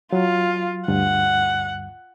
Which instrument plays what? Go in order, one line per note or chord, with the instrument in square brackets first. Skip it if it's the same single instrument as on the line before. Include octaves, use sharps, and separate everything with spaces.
[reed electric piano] F#3 [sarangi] F4
[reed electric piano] D2 G2 [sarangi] F#5